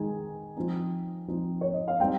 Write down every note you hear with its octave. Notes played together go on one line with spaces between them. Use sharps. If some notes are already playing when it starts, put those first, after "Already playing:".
Already playing: D#3 G#3 D#4 G#5
F3 C4 D#4
F3 C4 D#4
C#5
D#5
F5
G3 C4 D#4 G5